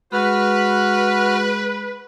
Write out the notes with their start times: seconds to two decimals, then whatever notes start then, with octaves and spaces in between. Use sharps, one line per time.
0.13 G#3 F#4 B4 F6